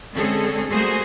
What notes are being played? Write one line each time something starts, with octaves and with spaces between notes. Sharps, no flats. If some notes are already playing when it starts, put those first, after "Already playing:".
D3 G#3 C4 C#4 G#4 A4
G3 A3 A#3 F#4 G#4 C5